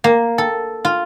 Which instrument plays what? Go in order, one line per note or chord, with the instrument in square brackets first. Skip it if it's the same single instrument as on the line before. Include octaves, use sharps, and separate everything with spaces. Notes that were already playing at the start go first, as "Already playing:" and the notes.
[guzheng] A#3
A4
F4